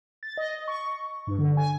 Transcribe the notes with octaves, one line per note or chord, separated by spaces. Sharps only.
A6
D#5
C#6
G2
D3
G#5